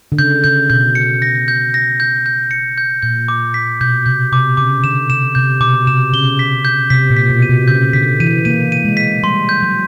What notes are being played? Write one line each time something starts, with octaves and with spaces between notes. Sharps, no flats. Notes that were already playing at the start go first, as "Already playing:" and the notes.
D3
C#3 G6
C#3 G6
B2 G6
C#7
A#6
G6
A#6
G6
G6
C#7
G6
A#2 G6
D6
B6
B2 G6
C3 G6
C3 D6
C#3 D6
D3 E7
C3 E7
C3 G6
B2 D6
C3 E7
C#3 G7
B6
G6
C3 B6
A#2
B6
B2
D#7
C3
C#3 G6
D3 B6
E3 D#7
A#3 D#7
D#7
G#3
B6
G3 C6
G6
F#3